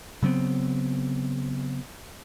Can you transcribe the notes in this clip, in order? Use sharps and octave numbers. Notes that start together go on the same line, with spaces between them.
C#3 F#3 B3 C4